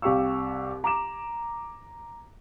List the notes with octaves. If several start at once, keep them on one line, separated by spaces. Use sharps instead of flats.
C2 G4 F5 C#6 E6
A#5 D6 E7